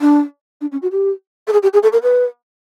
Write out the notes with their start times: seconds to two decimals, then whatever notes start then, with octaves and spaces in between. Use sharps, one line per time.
0.01 D4
0.61 D4
0.72 C#4
0.82 F#4
0.92 G4
1.47 A4
1.53 G#4
1.63 G4
1.73 G#4
1.83 A4
1.93 A#4
2.03 B4